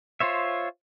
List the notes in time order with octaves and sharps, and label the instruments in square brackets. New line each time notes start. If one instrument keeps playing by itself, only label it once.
[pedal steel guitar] F4 C5 C#5 E5